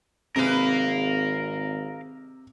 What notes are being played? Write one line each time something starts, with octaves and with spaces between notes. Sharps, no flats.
G#1 C3 G#4 A#4 B4 F5